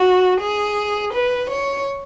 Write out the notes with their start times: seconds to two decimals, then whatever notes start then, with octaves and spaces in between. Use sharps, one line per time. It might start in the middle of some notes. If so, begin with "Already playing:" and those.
Already playing: F#4
0.39 G#4
1.12 B4
1.48 C#5